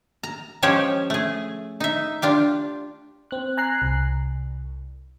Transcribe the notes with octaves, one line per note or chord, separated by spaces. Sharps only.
A#5
F3 G#3 C#4 G4 C5 C#5
A3 G#4
D#4 E5
D4 F4 G4
C4 F#6
G#5 A#5 F#6 C7
C2